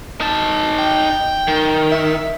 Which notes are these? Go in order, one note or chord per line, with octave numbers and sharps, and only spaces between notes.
D#4 A5
G5
D#3
E5